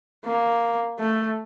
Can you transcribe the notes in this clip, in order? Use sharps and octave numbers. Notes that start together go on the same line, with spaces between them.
A#3
A3